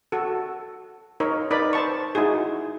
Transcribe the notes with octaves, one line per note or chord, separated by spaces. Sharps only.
F#4 A4
D#4 A#4 C#5
D#4 A#4 B4 D5 B5
C5 A5 C#6
D#4 E4 F#4 G#4